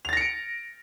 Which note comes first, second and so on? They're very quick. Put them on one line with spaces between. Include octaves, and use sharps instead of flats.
F7 A6 A#6 C#7 D7